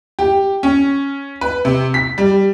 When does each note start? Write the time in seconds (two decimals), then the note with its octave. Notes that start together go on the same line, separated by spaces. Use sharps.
0.19 G4
0.63 C#4
1.41 B4
1.65 C3
1.94 B6
2.18 G3